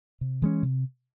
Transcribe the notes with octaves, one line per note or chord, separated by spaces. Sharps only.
C3
E3 G#3 C#4
C3